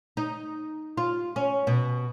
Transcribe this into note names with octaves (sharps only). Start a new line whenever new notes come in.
D#4
F4
C#4
B2